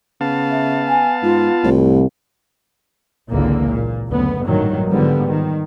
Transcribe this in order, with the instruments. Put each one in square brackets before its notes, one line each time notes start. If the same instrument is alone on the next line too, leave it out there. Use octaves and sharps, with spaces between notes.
[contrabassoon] C#3 [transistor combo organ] B3 F5 A5
[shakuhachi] E5
G#5
[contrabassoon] G#2 [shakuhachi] F4
[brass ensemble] C2 [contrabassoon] A2
[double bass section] G#1 C#2 D3 E3 A#3
A#2
F#1 D2 B3
A1 G2 A#2 D#3 F#3
G#2 D3 F3 G3 B3
D#3